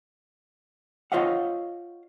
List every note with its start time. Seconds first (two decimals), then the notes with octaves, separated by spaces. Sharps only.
1.12 F4 C5 C#5 D#5 F5 F#5